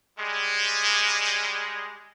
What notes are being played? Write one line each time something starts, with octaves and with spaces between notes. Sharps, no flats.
G3 G#3